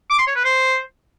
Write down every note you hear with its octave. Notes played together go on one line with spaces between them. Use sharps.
D6
C6
C#5
B4
C5